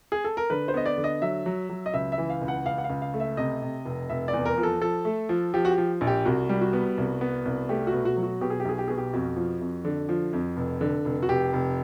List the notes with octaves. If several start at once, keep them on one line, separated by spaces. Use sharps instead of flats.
G#4
A4
A#4
D3 B4
C5
B3 D#5
D5
D3
D#5
F#3 E5
F#3
F#3
D#5
C#2 E5
E5
E3
F5
C#2
F#5
C#2 F5
F#5
F5
C#2
F5
A3
E5
C3 D#5
C3
F1
F1 E5
D5
E2
A#4
F3
A4
F3 A4
A3
F3
F3 G4
F#4
G4
F3
A#1
G4
C2 F#4
G3
F#4
B3
C2
B3
C2
A3 G4
F#4
B2
F#4
F#3
F#4
B2 G4
G#4
G4
B1 G#4
G4
B2 G#4
G4
F2 F#4
F3
F2
D3
F3
F2
F1
D3
F1
F#4
F1 G4
F1